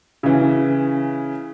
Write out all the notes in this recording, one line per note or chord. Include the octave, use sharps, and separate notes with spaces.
C#3 E3